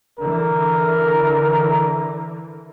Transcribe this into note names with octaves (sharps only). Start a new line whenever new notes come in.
D3 E3 A#4